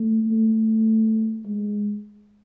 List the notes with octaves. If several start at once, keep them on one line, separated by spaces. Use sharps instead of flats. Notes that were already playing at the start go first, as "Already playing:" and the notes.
Already playing: A3
A3
G#3